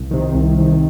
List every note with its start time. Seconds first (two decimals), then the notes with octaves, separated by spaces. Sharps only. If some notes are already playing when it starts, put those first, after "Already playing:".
Already playing: C2
0.11 C3 D#3
0.35 C2
0.58 C3 D#3